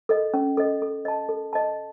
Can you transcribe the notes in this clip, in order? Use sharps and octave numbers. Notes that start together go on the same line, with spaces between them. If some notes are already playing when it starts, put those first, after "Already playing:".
A4 D#5
C#4
A4 D#5
A4
D#5 A5
A4
D#5 A5